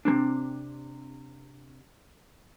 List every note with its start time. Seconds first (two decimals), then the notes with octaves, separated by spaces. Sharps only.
0.05 C3 A#3 C4 D4